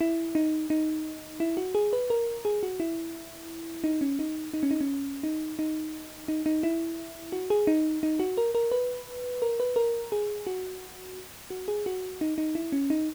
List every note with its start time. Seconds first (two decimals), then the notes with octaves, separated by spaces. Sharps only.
0.01 E4
0.35 D#4
0.70 D#4
1.40 E4
1.57 F#4
1.75 G#4
1.93 B4
2.10 A#4
2.45 G#4
2.63 F#4
2.80 E4
3.84 D#4
4.01 C#4
4.19 D#4
4.54 D#4
4.63 C#4
4.71 D#4
4.81 C#4
5.23 D#4
5.59 D#4
6.28 D#4
6.46 D#4
6.63 E4
7.32 F#4
7.50 G#4
7.67 D#4
8.03 D#4
8.20 F#4
8.38 A#4
8.55 A#4
8.72 B4
9.42 A#4
9.60 B4
9.76 A#4
10.12 G#4
10.47 F#4
11.50 F#4
11.68 G#4
11.86 F#4
12.21 D#4
12.38 D#4
12.55 E4
12.72 C#4
12.90 D#4